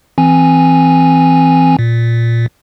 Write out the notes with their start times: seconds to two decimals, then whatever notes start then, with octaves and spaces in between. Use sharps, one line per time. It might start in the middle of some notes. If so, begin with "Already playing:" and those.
0.18 E3 C4 G#5
1.79 A#2